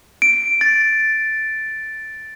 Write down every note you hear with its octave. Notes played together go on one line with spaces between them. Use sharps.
D7
A6